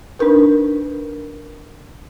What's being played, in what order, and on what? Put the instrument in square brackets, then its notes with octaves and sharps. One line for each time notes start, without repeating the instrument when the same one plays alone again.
[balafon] D4 D#4 A#4 B4